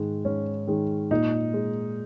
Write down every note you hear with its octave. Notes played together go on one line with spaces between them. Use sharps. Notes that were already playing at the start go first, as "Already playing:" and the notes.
Already playing: G#2 D#3 G#3
G#2 C#4
D#3 G#3
A#2 D#4
G#3